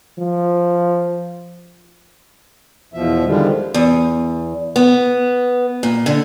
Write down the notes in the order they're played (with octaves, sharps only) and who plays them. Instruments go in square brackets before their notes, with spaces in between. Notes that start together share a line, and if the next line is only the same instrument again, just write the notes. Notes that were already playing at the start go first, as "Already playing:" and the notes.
[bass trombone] F3
[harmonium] E2 B2 F3 E5
D3 D#3 F3 G3 G#3
[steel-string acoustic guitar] E2
B3
A#2
D3